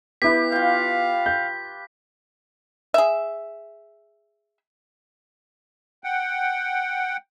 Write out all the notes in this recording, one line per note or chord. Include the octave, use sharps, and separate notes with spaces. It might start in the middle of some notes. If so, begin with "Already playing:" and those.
B3 E4 G4 B4 B6
F4 F5 G5
G6
G#4 E5
F#5 G5